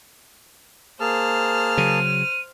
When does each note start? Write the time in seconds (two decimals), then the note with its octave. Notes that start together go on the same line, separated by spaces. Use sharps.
1.00 A#3 G#4 C5 A5 F6
1.77 C#3 F#3 D#7